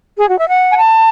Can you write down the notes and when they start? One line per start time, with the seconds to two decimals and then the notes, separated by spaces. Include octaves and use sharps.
0.19 G#4
0.29 F#4
0.39 E5
0.48 F#5
0.71 G#5
0.77 A5